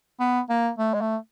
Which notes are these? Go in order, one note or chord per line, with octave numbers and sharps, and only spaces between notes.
B3
A#3
A3
G#3
A3